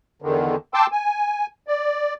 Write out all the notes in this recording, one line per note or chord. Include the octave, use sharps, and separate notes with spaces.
E2 D3 D#3
G5 A5 C6 D6 E6
G#5
D5